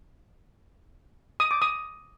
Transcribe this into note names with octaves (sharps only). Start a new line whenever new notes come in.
D#6
D6
D#6